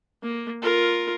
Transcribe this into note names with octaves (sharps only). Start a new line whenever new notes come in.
A#3
F4 A#4